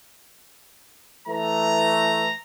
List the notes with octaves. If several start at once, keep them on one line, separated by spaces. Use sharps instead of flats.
E3 A3 A#5